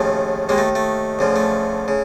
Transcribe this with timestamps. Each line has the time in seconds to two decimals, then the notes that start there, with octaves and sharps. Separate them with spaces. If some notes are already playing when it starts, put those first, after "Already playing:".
Already playing: D#2 C#3 F3 A3
0.49 D#2 D#3 G#3 A#3
0.58 A3
0.75 A3
1.19 D2 C#3 F3
1.36 A3
1.88 C#3